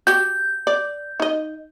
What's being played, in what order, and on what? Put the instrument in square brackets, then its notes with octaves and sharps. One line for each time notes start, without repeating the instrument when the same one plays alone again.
[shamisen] F#4 G4 [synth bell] G6
[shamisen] D5
D#4 D#5